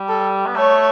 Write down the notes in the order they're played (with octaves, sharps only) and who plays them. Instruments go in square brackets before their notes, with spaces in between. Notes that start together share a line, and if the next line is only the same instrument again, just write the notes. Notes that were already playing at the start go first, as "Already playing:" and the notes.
Already playing: [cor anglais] G3
[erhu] A4
[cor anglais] B3
[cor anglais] A3 [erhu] C#5